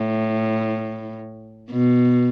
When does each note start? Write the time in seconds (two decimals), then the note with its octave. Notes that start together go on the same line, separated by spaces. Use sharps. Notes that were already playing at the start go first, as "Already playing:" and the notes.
Already playing: A2
1.70 B2